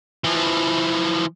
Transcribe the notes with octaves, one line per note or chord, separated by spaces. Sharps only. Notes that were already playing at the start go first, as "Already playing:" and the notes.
E3 F3